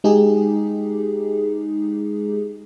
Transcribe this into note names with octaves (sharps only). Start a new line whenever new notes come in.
G#3 D#4 G4 G#4